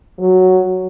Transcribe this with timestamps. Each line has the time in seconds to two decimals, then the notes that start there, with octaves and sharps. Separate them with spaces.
0.19 F#3